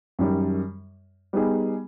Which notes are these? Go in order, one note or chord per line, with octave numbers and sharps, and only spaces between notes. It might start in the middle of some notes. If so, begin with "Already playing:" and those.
F#2 D#3 G3
G3 B3 D#4 G#4